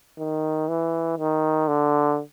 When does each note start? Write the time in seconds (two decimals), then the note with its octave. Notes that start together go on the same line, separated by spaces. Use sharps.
0.18 D#3
0.69 E3
1.18 D#3
1.68 D3